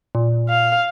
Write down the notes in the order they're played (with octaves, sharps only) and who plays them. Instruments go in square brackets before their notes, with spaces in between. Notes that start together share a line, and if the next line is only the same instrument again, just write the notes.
[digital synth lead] A#2
[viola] F5